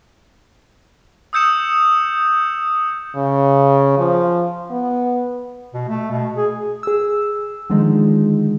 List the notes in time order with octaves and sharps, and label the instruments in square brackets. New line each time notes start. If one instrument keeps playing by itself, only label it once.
[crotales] D#6 E6 G6 C#7 E7
[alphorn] C#3
F3
B3
[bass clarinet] B2
A3
B2
G#4
[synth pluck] G#4 E6
D3 D#3 F3 G#3 D#4